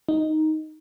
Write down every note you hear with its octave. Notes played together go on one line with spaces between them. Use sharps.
D#4